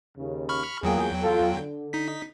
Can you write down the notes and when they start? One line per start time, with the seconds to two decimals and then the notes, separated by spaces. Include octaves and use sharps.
0.17 D#2 C#3
0.49 B5 C#6 F6
0.83 E2 F#3 A#3 F4 G#4 G5
1.22 F4 A4
1.56 D3
1.93 D#4 B6